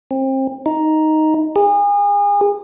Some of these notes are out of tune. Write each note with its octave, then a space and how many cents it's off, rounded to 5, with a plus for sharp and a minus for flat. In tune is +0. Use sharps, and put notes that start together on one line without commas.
C4 +30
D#4 +5
G#4 -35